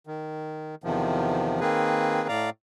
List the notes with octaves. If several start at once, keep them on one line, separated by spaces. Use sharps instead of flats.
D#3
E2 C3 D#3 F3
D#3 A#3 C4 G#4 B4
A2 D5 F5 A#5